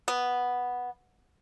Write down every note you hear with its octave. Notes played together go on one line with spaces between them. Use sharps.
B3